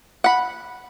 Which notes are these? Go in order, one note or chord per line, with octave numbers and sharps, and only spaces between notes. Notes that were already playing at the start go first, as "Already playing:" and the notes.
F#5 B5